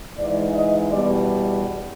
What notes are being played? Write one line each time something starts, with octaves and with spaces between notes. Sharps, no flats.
G#2 E3 G#3 D5
D#5
E2 B2 G3 D5